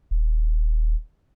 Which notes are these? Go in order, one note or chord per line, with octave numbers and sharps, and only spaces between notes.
D#1